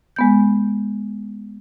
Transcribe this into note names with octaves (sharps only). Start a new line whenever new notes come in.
G#3 B3 G6